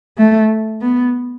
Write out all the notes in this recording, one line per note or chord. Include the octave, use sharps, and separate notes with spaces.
A3
B3